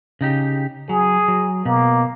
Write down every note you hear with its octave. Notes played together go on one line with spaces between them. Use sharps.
C#3 D#4 G4
F#3 G#4
F#3
B2 A#3